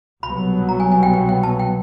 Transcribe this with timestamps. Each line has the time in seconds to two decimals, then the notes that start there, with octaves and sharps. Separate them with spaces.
0.23 C2 B2 F#3 B3 B5
0.69 A#5
0.80 G#5
0.92 G#5
1.03 G5
1.14 G5
1.29 G5
1.43 A5
1.59 G5